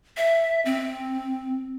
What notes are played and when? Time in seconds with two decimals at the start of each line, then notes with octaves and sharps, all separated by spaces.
0.17 E5
0.65 C4